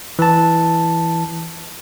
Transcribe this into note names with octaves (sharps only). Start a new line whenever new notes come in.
E3 A5